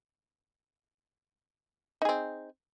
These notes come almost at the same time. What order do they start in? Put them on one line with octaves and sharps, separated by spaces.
D#4 G#4 C4